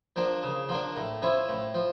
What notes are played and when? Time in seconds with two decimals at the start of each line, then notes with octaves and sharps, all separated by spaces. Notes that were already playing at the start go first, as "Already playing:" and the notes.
0.16 F3 A#3 D4
0.43 C#3
0.69 F3 A#3 D4
0.96 A2
1.22 F3 C#4 E4
1.49 A2
1.74 F3